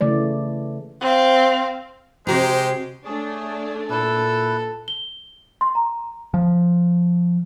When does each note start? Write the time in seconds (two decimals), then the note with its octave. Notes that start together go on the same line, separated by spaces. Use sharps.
0.01 C#3 E3 A3 D5
1.01 C4 F5
2.27 C3 G#3 F#4 G4 C5 A#5
3.05 A3 D4 G#4 C#5
3.90 A#2 E4 A4 B4 E6
4.88 G7
5.61 C6
5.75 A#5
6.34 F3